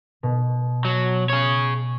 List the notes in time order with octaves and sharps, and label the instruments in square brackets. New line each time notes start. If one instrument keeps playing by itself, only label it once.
[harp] B2
[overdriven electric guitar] F#3
G#4 C#5